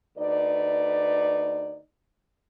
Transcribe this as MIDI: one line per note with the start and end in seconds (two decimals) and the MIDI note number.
0.17 1.80 38
0.17 1.80 63
0.17 1.80 71
0.17 1.80 74